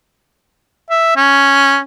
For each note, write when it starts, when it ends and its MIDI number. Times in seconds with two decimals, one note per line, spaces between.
0.90 1.14 76
1.16 1.80 61